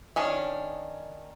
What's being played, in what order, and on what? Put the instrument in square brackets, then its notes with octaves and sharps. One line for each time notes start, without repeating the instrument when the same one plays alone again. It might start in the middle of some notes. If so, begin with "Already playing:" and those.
[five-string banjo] D#3 C#4 D4